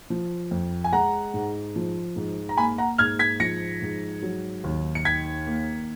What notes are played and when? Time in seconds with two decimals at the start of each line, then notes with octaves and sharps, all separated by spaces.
0.10 F3
0.51 F2
0.84 G#5
0.93 G#3 F#5 A#5
1.34 G#2
1.76 F3
2.16 G#2
2.49 A#5
2.57 A#3 G#5 B5
2.78 F#5 A#5
2.98 G#2 F6 G#6
3.19 G#6 B6
3.40 F3 A#6 C#7
3.82 G#2
4.22 F#3
4.64 D#2
4.95 C#7
5.05 D#3 G#6 B6
5.47 A#3